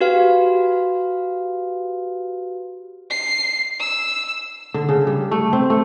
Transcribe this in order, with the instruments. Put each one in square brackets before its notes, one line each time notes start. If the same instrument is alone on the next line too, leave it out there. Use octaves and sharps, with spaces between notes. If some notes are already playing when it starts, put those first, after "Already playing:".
[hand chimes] F#4 G4 B4 F5
[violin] C7
E6
[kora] D3
C#3
G3
A3
C4
A3